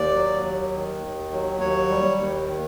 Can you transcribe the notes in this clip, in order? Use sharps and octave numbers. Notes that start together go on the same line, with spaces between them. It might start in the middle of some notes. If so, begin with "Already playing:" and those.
Already playing: D#2 D5
F#3
D#2
D#3
D#2
F#3
D#2 C#5
G3
D#2
D#3